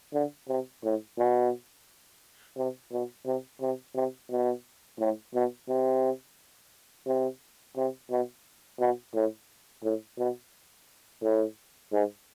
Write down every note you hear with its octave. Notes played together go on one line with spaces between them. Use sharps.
D3
C3
A2
B2
C3
B2
C3
C3
C3
B2
A2
B2
C3
C3
C3
B2
B2
A2
A2
B2
A2
G#2